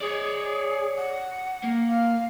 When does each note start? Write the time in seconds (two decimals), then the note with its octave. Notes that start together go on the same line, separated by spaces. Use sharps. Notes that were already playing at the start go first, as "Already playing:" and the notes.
0.01 G#4 C#5 D5
0.97 F#5
1.64 A#3
1.90 F5